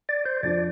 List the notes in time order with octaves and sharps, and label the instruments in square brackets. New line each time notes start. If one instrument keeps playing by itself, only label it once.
[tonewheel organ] D5
C5
[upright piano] F2 F3 D4 [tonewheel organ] D5